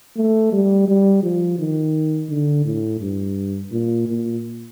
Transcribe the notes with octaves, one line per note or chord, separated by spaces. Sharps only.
A3
G3
G3
F3
D#3
D3
A2
G2
A#2
A#2